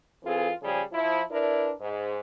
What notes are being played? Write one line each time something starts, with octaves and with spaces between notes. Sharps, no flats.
E3 C4 F4 G#4 A4
C#3 F3 G3 G#4
F3 E4
D4 E4 A#4 B4 D5
G#2